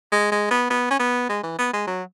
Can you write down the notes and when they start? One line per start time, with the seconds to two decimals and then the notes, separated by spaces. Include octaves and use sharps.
0.12 G#3
0.32 G#3
0.51 B3
0.70 B3
0.91 C#4
0.99 B3
1.29 G#3
1.43 E3
1.59 B3
1.73 G#3
1.87 F#3